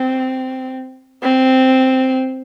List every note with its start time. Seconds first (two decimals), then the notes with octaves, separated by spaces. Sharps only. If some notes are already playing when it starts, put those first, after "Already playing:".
Already playing: C4
1.23 C4